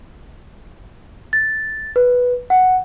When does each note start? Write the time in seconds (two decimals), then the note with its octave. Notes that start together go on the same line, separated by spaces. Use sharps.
1.33 A6
1.96 B4
2.50 F#5